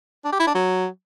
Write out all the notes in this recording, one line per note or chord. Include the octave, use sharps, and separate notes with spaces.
D4
G4
E4
D4
F#3